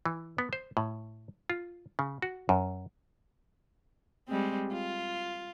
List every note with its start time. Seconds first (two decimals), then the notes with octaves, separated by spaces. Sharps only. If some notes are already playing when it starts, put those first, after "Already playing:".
0.06 E3
0.38 B3
0.53 C5
0.77 A2
1.50 F4
1.99 C#3
2.22 F#4
2.49 F#2
4.28 G3 G#3 C4
4.72 F4